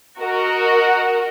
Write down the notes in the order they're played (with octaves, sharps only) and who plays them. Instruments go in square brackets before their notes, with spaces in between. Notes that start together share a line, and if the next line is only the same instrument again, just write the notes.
[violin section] F#4 A#4 D#5